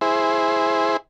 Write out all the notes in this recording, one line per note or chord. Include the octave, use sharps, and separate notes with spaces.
E4 G#4 C5